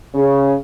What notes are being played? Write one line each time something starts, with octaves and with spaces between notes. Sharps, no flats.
C#3